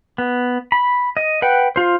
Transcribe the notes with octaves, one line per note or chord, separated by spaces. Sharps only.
B3
B5
D#5
B4 F#5 G5
F4 C5